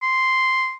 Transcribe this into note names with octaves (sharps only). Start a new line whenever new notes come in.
C6